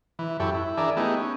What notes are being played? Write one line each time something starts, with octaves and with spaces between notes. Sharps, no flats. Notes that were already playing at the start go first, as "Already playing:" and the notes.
E3
F#2 E4 G4 A4 C#5
E4
E3 D4 G#4 A#4 D5 E5
A3 B3 D#4 E4 G4 G#4
C#4